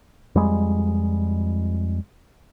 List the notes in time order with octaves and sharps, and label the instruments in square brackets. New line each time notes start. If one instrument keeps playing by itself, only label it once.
[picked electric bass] F2 G3 G#3